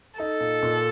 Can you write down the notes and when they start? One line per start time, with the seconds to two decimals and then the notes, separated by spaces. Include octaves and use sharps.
0.19 D#4 A4
0.40 A#2
0.62 A#2